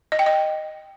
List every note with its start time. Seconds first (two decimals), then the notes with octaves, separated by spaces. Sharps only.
0.12 D#5
0.19 G5
0.26 D#5